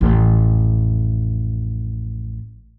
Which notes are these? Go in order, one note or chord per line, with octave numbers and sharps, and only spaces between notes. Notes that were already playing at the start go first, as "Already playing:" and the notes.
A1 F2